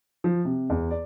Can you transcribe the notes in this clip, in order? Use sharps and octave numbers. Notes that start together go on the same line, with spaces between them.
F3
C3
E2
D5